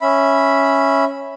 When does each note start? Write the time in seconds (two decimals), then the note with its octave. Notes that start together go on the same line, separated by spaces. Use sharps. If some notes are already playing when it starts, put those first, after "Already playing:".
0.01 C#4 E5 B5